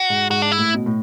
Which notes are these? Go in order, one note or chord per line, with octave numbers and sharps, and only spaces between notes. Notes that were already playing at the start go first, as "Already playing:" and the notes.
Already playing: F#4
G#2
G#2 F#4
D4
E4
A2
B2
A2